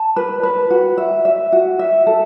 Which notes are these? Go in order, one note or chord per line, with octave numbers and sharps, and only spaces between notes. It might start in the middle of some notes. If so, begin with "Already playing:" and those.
Already playing: A5
B4
B4
F#4
E5
E5
F#4
E5
A4